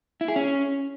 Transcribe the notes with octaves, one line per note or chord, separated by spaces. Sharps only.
E4
G#4
C#4